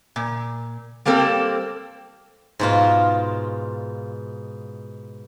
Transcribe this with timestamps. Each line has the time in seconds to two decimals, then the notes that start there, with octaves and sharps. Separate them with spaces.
0.16 A#2
1.05 G3 A#3 C4 A4
2.59 G#2 B2 F4